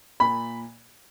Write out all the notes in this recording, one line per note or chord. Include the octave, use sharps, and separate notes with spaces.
A#2 B5